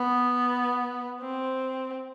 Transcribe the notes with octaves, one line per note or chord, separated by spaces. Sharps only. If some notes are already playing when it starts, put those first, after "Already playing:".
Already playing: B3
C4